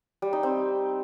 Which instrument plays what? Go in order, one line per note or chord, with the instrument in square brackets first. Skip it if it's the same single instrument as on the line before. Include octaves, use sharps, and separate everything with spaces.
[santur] G3
D#4
C4